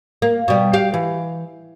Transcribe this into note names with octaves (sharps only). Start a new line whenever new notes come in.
A#3
B2 G3
G4 F5
E3